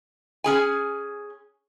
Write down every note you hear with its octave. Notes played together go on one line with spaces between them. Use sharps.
C#4 G#4 G#5